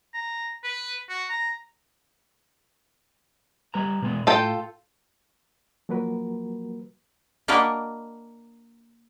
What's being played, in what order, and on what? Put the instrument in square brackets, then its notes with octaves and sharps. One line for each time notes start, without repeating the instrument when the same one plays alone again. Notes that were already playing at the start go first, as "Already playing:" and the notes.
[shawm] A#5
B4
F#4
A#5
[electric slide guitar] G3 B4 A#5
B2 G#3 B3
[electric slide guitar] A2 [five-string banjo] F4 A4 G5
[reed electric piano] F3 F#3 A#3 F#4 A#4 B4
[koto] A#3 D4 F#4 A#4 B4 D#5